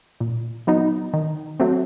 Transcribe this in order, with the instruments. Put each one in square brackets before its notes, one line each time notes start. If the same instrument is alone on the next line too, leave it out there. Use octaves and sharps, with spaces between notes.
[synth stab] A#2
F#3 B3 D#4
D#3
F#3 A3 C4